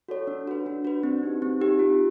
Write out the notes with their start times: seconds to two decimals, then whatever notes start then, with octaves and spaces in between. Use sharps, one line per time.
0.08 F#4 A4 C#5
0.27 D4
0.47 F#4 B4
0.66 D4
0.85 F#4 B4
1.03 C4
1.23 D#4 G4
1.42 C4
1.61 D#4 G4
1.79 F4